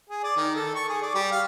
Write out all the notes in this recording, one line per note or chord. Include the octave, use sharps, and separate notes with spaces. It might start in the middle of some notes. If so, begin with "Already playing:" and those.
G#4
D5
D#3
A4
C#6
G#4
D5
G3
F5